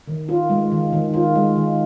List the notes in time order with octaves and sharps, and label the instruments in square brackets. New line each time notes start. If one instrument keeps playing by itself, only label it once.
[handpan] D#3
F4
G#3
D#3
D#3
F4
G#3
D#3